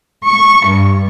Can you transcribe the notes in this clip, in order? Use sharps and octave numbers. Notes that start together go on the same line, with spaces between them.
C#6
G2